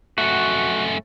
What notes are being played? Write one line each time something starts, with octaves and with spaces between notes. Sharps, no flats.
F#2 A3 F#4